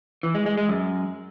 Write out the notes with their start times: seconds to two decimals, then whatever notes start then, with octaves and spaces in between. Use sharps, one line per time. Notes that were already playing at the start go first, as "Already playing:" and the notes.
0.23 E3
0.35 G#3
0.46 G#3
0.57 G#3
0.69 F#2